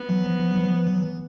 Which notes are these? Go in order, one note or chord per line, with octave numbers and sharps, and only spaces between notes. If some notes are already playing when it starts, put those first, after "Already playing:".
Already playing: B3
E3 F#3
F3
F3
F#3
F3
F#3
F3
E3 F#3
E3